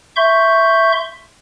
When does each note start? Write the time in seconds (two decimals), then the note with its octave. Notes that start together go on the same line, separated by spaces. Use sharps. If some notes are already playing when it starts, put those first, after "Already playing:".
0.16 E5 C6 C#6 G6